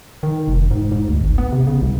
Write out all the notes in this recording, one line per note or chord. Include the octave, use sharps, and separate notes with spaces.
D#3
F1
G#2
G#2
D2
G#1
B3
C3
C#3
C2